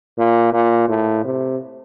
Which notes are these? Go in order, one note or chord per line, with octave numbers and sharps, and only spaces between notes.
A#2
A#2
A2
C3